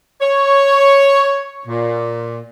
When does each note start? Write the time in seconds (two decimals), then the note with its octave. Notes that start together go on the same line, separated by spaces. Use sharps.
0.21 C#5
1.68 A#2